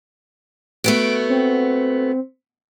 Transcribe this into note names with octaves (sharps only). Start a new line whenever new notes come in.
A3 B3 F#4 D7
C4